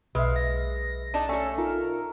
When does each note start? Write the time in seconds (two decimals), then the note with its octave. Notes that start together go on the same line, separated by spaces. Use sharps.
0.15 B1 G#3 B4 E5 F5
0.36 A#6
1.14 D4 D#4 A5
1.29 A3 C#4 A4
1.58 D#4 F4 A#4